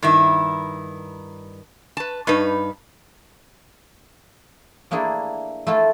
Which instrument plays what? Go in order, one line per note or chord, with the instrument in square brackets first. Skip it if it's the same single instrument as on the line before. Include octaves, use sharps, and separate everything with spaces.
[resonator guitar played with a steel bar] G2 D#3 E4
B4 A5
G2 D#4 B4
[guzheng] A3 A#3 D4 E4 G#4
A3 E4 F4 A4